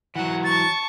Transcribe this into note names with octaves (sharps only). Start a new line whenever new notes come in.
E3 F#3 F#5
A5 C#6 A6